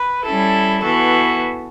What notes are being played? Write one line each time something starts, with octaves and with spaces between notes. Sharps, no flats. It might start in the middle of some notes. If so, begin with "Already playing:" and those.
Already playing: B4
G3 C#4 E4 A4
E3 B3 F#4 A4